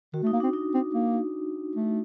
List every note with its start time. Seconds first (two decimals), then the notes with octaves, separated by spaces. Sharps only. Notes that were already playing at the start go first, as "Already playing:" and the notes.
0.13 D#3 F#4
0.23 A3
0.27 D#4
0.33 A#3
0.40 C4 D4
0.53 D#4
0.74 C4
0.94 A#3
1.75 A3